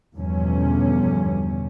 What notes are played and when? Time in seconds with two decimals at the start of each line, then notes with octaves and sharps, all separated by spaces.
0.16 E2 G2 B2 D3 F3 C#4